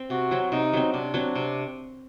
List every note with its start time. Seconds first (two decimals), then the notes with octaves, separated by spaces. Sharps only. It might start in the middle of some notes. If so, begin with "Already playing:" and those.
Already playing: C4
0.10 C3 F#4
0.31 F#3 C4
0.52 C3 D#4
0.73 F#3 C4
0.94 C3 D4
1.14 F#3 C4
1.35 C3